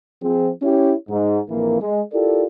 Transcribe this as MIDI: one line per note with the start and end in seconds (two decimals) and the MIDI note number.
0.22 0.50 53
0.22 0.50 60
0.22 0.50 68
0.62 0.93 61
0.62 0.93 64
0.62 0.93 67
0.62 0.93 73
1.09 1.39 44
1.49 1.80 34
1.49 1.80 41
1.49 1.80 52
1.49 1.80 58
1.81 2.01 56
2.12 2.45 64
2.12 2.45 65
2.12 2.45 67
2.12 2.45 69
2.12 2.45 70
2.12 2.45 74